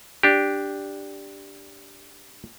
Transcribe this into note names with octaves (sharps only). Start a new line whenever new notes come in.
D4 G4